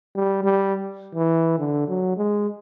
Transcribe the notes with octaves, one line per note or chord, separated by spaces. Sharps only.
G3
G3
E3
D3
F#3
G#3